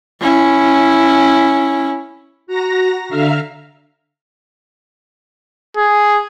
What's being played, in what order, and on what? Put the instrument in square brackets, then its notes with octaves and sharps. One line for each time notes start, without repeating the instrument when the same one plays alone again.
[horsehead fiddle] C#4 E4
[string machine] F#4 A#5 A#6
D3 E5 F5 A#5 F6
[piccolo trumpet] G#4